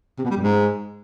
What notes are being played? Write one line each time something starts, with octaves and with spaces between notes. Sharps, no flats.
C3
B2
G3
F#2
G#2